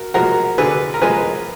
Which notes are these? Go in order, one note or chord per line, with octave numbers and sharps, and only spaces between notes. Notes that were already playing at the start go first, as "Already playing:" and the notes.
Already playing: F#4 A#4
F3 G#3 F#4 A#4
D3 G#4 B4
A#4
F3 G#3 G#4 B4